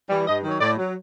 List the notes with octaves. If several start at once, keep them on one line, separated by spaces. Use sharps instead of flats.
E3 G3
G2 D#5
D#3 F#3
C#5
A2 D5
F#3